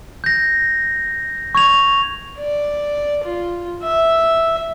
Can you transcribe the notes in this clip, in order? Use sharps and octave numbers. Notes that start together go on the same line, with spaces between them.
G6 A#6
C#6 G#6 F7
D5
F4
E5